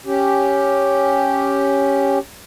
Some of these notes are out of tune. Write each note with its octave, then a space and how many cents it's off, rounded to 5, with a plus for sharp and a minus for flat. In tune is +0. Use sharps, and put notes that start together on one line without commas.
C#4 +0 G4 +0